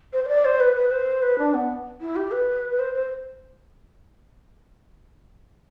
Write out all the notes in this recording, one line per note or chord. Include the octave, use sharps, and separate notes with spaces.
C5
C5
D5
C5
B4
B4
C5
B4
D4
B3
E4
G4
B4
B4
C5
C5